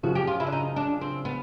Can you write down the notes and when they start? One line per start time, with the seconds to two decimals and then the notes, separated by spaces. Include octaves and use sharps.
0.03 F#2 C#3 F3 F#4
0.15 G4
0.27 F4
0.40 E4
0.47 D4
0.52 D#4
0.76 D4
1.01 C4
1.25 B3